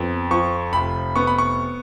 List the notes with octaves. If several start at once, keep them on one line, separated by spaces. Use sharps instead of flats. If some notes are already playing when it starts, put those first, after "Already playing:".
Already playing: F2 B3
F3 C#6
F1 B5
B3 C#6
B5
C#6